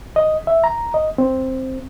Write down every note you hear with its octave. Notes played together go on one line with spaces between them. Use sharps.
D#5
E5
A#5
D#5
C4